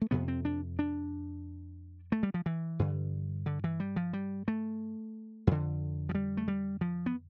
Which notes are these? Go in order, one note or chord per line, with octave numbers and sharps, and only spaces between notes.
A3
F2 C3 B3
C4
D4
D4
A3
G3
F3
E3
G2 D3
D3
E3
G3
F3
G3
A3
F2 D3
F3
G3
A3
G3
F3
B3